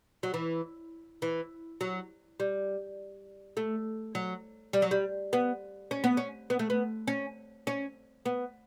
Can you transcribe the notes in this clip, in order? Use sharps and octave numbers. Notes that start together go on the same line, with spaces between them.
F#3
E3
E3
F#3
G3
A3
F#3
G3
F#3
G3
B3
C#4
B3
C#4
B3
A3
B3
C#4
C#4
B3